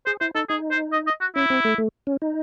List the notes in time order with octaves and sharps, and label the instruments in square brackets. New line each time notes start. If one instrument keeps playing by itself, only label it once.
[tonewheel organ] G#4 [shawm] C5
[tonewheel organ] E4 [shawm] C5
[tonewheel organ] D#4 [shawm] A4
[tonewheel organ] D#4 [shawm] G#4
[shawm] C5
D#5
D#5
F#4
[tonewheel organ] C#4 [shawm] E4
[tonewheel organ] C4
A3
A3
C#4
D#4